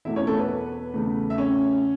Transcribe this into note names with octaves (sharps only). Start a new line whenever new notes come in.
E2 B2 A3 E4 E5
C#4 C#5
A3 A4
B3 B4
E2 C#3 A3
E5
C#4 C#5